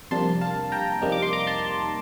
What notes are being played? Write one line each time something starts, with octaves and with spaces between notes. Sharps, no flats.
F2 C3 G3 A#3 D4 A5 C6
F5 A5
G5 A#5
F2 C3 G3 A#3 D#4
D6
C6
A#5 D6
A5 C6